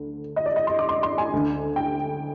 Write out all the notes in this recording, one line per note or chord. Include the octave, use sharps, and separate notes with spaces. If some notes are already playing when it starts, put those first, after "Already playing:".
Already playing: D2 D3
D#5
D5
D#5
C6
D6
C6
C6
G#5
D2 D3
G5